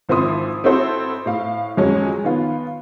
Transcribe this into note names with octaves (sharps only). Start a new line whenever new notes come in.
G#1 F3 C4 E4 C6 D#6
C4 E4 F#4 A4 C5
A2 F5
F2 F#3 G#3 C#4
D#3 B3 F4